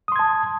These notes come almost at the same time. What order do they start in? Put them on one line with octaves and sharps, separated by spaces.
D#6 C6 G#6 A5